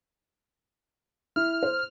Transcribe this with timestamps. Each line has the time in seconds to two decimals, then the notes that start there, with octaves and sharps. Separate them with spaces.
1.36 E4 F6
1.63 C5